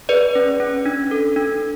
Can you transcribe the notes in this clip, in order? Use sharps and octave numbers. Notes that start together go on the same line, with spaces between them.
G#4 B4 D5
C#4
C#4
D4
A4
D4